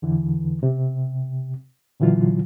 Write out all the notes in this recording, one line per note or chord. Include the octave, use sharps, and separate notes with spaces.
E2 D3 E3
C3
A#2 D3 E3 F#3 F4